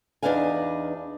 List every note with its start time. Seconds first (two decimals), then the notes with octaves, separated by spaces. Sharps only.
0.23 E2 D4 D#4 B4 F5 G#5